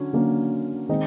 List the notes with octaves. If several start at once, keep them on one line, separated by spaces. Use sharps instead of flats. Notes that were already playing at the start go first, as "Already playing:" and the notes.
Already playing: D3 F#3 C#4
D3 F#3 A#3 C#4
D#3 G#3 C4 D#4